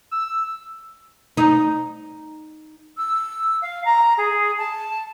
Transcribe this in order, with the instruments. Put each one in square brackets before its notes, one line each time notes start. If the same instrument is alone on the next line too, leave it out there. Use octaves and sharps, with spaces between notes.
[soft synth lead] E6
[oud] D#4
[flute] E6
F5
A#5
G#4
A5